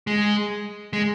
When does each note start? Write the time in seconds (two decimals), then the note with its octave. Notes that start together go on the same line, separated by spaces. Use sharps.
0.07 G#3
0.93 G#3